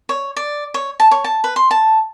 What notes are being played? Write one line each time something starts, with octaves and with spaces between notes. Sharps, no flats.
C#5
D5
C#5
A5
C#5
A5
B4
C6
A5